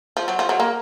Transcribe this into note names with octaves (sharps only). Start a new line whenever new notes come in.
F3
F#3
F3
F#3
A#3